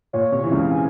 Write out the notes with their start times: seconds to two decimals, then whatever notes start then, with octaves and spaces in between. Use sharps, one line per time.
0.13 A#2 C#5
0.32 C3 C#5
0.44 E3
0.51 C#2 C#3 F5
0.71 G#5